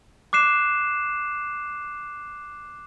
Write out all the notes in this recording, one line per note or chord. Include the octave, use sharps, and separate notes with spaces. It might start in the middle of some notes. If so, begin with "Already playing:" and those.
D6 F#6 C7 E7